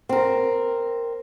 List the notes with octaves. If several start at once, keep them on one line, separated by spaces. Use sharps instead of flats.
C4 A#4